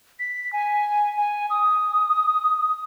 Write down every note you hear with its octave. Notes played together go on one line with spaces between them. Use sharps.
B6
G#5
G#5
D#6